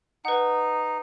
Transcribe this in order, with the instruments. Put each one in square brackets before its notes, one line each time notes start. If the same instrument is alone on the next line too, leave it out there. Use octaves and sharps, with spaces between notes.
[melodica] D#4 [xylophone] B4 F#5